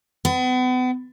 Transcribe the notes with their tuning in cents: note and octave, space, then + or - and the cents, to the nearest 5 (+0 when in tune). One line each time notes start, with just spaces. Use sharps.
B3 +40